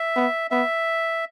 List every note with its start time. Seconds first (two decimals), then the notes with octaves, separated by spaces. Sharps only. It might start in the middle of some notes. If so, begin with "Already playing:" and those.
Already playing: E5
0.16 B3
0.51 B3 E5